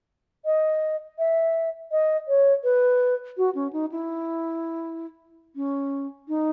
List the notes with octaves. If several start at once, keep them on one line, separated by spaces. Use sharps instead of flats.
D#5
E5
D#5
C#5
B4
F#4
C#4
D#4
E4
C#4
D#4